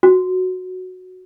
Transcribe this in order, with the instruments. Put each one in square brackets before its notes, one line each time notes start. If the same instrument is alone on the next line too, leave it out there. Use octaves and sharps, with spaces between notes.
[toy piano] F#4